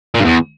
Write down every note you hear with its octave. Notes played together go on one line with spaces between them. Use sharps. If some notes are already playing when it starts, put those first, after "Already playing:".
A#2
G2
E2